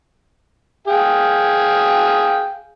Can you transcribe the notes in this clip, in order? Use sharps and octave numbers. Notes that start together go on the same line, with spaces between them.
G#4 F5 G5